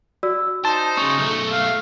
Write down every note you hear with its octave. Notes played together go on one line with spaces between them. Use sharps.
F#4 D5 E6
D#4 C5 A5
C#3 C#4 C#6
B1 A3
F5